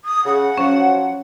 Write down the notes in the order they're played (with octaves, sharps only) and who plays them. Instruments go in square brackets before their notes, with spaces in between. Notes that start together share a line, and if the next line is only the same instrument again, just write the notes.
[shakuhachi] D#6
[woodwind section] C#3 [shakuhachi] F#5
[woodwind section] F3 F#3 [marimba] C#4 F5 C#6